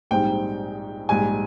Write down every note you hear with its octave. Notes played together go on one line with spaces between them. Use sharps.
A#1 G#2 G3 C4 D#4 G5
A#1 G#2 G3 G#5